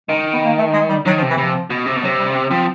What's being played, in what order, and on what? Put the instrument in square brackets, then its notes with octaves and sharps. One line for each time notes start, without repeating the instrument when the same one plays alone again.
[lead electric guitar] D#3 [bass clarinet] G#3
[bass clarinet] B3
A#3
A3
G#3
G3
[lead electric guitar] D#3 [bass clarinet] F#3
[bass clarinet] F3
[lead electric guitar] C3
[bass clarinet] E3
[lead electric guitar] C3 [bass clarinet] F3
[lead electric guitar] B2
C3
B2
[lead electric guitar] C3 [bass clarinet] F#3
[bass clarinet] G3
C4
[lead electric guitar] F3 [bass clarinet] C4